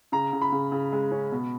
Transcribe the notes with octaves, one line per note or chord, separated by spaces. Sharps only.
C#3 A#5
C#3
B5
C#3
C#3
G#3
C#4
B2